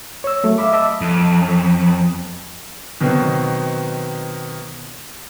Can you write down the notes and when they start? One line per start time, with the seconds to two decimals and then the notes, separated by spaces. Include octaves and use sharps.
0.24 C#5 E6
0.44 F#3 A3
0.58 E5 F5 B5 D6
0.73 D#5 E5 A5 D6 E6
1.01 F2
3.01 B2 D#3 F#3 B3 C4